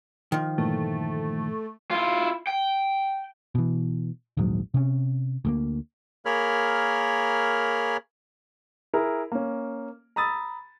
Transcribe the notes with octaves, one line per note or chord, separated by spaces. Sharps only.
D#3 F3
G2 A#2 E3 A3
E4 F4
G5
B2 E3
D#1 A#1 G#2 F#3
C3 C#4
D2 A3 A#3
A#3 G#4 A#4 C#5 B5 F6
E4 G#4 A#4
A#3 C#4
A#5 B5 D#6 E6 A6